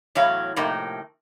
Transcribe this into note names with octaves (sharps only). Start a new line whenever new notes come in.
E2 A2 F#3 C#5 F5
A2 C3 F3 A3 A#3 D#4